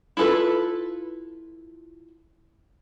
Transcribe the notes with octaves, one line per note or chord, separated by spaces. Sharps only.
E4 F4 A4 B4